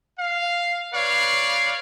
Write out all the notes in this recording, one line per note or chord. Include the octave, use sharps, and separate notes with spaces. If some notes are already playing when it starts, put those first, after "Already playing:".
F5
B4 C#5 D5 F5